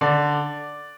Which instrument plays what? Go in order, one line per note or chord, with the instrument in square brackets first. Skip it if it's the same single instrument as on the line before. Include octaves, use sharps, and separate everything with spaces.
[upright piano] D3 D5